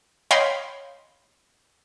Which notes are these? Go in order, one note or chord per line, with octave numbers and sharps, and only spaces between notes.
C#5 D#5 F5 G5 B5 C6